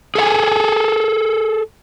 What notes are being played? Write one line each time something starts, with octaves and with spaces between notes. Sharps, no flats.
G#4 A4 E5 G#5